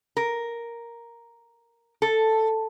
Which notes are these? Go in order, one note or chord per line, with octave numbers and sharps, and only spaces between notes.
A#4
A4